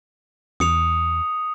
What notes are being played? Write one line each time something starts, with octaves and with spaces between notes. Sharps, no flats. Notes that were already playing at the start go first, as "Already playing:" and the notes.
E2 D#6 C#7 F7